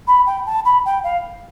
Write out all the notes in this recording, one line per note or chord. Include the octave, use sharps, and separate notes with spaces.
B5
G5
A5
B5
G5
F5